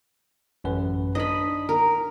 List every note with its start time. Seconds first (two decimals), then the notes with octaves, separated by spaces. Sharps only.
0.64 A1 F#2 B4
1.15 D4 D#4 D#5 B5
1.69 A#4